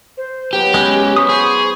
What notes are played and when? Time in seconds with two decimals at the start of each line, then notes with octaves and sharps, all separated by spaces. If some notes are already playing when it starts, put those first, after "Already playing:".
0.17 C5
0.53 F#3 B3 E4 G4 B4
0.74 G#3 C#4 B4 G#5
1.16 C5 B5 C#6 D#6
1.29 G#4